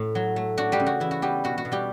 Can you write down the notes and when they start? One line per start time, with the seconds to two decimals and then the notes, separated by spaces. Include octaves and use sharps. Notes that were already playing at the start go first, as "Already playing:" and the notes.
Already playing: A2
0.15 F#3
0.36 A3
0.57 D4 F#4
0.72 G3 G4
0.80 C#3
0.86 F#4
1.00 E3 E4
1.11 F#4
1.22 G3 B3 G4
1.44 B2 F#4
1.58 F#4
1.65 B2
1.72 G3 G4